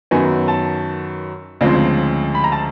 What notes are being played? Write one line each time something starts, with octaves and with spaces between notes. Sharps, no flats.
F#2 D#3 F#3 B3 G#5
A5
D2 C#3 F3 G#3 C4
B5
A#5
A5